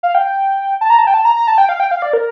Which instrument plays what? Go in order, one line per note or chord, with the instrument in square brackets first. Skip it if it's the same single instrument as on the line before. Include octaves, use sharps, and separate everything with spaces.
[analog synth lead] F5
G5
A5
A#5
A5
G5
A5
A#5
A#5
A5
G5
F5
G5
F5
D5
A#4